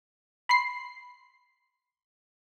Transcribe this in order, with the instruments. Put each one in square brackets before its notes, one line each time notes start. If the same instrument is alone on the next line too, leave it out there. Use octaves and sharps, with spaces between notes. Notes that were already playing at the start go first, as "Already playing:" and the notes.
[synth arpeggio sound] B5 C6 C7